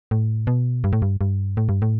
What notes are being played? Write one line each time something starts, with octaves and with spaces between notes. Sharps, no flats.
A2
B2
G2
A2
G2
G2
A2
G2
A2